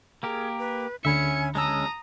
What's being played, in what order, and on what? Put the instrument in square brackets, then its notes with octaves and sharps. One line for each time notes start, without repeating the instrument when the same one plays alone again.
[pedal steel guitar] A#3 G4 A#4 [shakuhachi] G#4
[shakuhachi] B4
[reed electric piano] D2 D3 B5 [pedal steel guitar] C#4 E5 [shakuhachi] G#5 [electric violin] C#7
[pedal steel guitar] G#3 C#4 E6 [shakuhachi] A5 [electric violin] A#5 D#6